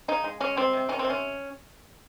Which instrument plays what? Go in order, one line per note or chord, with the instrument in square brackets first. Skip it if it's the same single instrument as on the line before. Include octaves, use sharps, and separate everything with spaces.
[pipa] C#3 D#4
G#3
G#3 C#4
G3 C4
C3
D#3 C#4
C4
C3
C#4